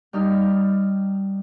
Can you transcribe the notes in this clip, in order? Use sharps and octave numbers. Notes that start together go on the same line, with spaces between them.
G3 D#4 F6